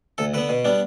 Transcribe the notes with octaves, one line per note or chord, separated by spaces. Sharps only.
D2 A4
D3 B3 B4
B2
G3 B3 D4